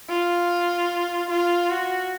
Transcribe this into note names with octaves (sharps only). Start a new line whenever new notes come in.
F4
F4
F#4